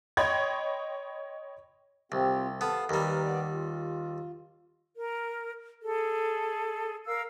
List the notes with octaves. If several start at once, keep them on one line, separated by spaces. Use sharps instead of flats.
C#5 D#5 G5 B5 C6 G#6
C2 C4 F4 G4
B3 A4 F5 A5
D#2 G3 A#4 B4
B3 D5
F4
A#4
G#4 A4
A#4 F5 E6